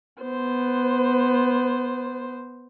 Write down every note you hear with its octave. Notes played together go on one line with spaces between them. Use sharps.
B3 C5